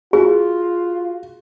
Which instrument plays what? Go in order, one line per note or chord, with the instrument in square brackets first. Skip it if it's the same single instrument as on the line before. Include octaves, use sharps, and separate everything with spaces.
[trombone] F4 [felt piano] F#4 [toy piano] G#4